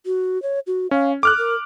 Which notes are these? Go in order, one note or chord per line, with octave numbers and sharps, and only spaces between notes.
F#4
C#5
F#4
C#4 F5
A4 D6 F6 F#6
A#4